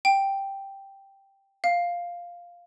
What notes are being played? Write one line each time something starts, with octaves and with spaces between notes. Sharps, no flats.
G5
F5